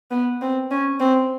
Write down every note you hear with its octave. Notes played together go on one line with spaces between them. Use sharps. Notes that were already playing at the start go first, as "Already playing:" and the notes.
B3
C4
C#4
C4